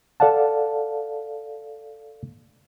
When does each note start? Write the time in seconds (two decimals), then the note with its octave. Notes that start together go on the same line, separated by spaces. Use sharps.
0.20 A4 D5 F5 F#5 A5